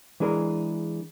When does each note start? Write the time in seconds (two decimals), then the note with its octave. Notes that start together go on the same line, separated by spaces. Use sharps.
0.20 E3 G#3 D4 G#4 A#4